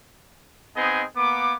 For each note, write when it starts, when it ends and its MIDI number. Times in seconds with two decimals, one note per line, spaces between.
0.76 1.04 59
0.76 1.04 60
0.76 1.04 63
0.76 1.04 68
0.76 1.04 75
0.76 1.04 80
1.17 1.55 58
1.17 1.55 59
1.17 1.55 86